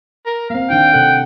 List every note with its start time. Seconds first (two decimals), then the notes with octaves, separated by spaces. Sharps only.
0.26 A#4
0.50 A#3 C4 F5
0.70 D#3 D4 G5
0.93 C3 A4 F#5